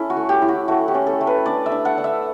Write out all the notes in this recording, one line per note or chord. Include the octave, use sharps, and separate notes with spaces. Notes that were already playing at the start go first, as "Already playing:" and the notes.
Already playing: C#4 E4 A4
F#4
A3
G4
E4
F#4
A3 F#4
G4
C#4
A4
A3
B4
D4 D5
E5
D4
F#5
D4
E5